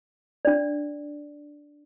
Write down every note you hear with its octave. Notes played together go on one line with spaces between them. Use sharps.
D4 D5